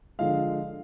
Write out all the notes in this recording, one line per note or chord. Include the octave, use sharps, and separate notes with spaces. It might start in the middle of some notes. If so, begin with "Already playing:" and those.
D3 F3 G#3 F5